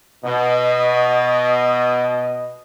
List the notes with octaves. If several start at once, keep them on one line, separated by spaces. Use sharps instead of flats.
B2 D#5